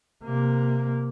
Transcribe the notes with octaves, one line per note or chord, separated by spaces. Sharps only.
C3 A#3